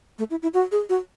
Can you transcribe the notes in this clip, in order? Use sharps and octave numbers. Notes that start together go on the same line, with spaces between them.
A3
E4
E4
F#4
G#4
F#4